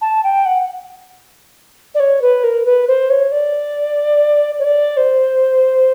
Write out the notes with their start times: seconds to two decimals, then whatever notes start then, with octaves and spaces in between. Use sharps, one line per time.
0.01 A5
0.23 G5
0.45 F#5
1.94 D5
1.99 C#5
2.21 B4
2.43 A#4
2.65 B4
2.87 C5
3.09 C#5
3.31 D5
4.59 C#5
4.64 D5
4.97 C5